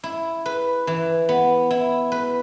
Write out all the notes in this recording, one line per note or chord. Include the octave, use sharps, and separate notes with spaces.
E4
B4
E3
B3
E4
B4